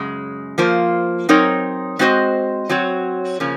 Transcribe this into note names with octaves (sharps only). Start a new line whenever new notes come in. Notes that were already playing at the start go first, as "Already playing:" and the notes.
Already playing: F#2 C#3 G#3
F3 A#3 F4 C5
F#3 C4 D#4 A#4 C#5
G#3 C4 F#4 C5 D#5
F#3 C4 F#4 C#5
C#3 F3 A#3 C#4